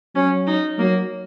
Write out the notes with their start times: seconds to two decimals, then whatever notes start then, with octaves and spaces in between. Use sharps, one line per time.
0.15 F#3 C#4
0.47 D#4
0.79 F#3 A#3